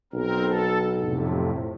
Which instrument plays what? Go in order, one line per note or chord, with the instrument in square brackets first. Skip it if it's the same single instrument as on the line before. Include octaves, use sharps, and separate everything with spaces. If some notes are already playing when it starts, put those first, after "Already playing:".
[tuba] B1 [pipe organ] C4 A#4
[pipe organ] A4
F2 A2 C3